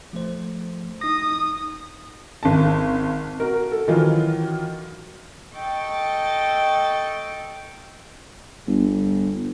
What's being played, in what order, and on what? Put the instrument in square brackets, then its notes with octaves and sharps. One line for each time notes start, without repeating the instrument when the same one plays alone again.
[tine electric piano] F3 A3 C5
[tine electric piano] D#4 A#6 [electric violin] D#6
[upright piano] G#1 A5
F#4 A#4
A4
D#3 E3 F#3 F4
[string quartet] A4 D#5 G5 C#6 A6
[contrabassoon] G1